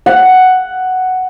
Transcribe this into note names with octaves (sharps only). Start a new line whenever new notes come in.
F#5